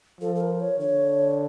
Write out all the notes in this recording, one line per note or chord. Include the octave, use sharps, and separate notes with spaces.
F3 A4
A4
A#4
C#5
D3 C#5